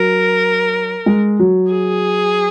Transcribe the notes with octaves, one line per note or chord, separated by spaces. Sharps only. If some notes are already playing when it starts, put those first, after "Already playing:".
Already playing: F#3 A#4
G#3
F#3
G#4